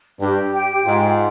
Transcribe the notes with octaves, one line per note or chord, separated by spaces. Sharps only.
G2 G4
G5
G#2 F4